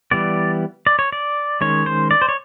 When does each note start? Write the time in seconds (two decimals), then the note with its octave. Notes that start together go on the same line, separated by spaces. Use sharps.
0.11 E3 G3 B3 D5
0.87 D5
0.99 C#5
1.12 D5
1.61 D#3 G#3 C#4 C#5
1.86 C5
2.11 D5
2.22 C5
2.29 C#5